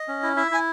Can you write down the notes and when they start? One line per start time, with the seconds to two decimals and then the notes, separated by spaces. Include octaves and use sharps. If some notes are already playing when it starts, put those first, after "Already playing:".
Already playing: D#5
0.08 C#4
0.23 E4
0.37 E4 E5
0.51 E4 G#5